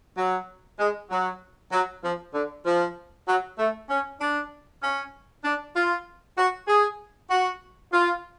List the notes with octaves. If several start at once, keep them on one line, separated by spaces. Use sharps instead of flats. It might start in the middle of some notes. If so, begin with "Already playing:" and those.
F#3
G#3
F#3
F#3
F3
D3
F3
F#3
A3
C#4
D4
C#4
D4
F4
F#4
G#4
F#4
F4